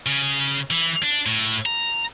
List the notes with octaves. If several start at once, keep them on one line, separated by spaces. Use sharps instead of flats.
C#3
E3
D4
A2
A#5